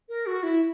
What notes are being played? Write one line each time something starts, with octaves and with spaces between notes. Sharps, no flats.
A#4
F#4
E4